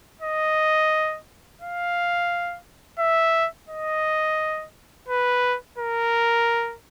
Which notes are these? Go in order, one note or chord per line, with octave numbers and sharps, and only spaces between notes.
D#5
F5
E5
D#5
B4
A#4